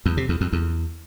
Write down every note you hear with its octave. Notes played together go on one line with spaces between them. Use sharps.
E2
C3
E2
F2
E2